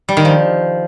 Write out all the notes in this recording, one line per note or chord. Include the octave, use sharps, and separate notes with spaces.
G3
D#3
F3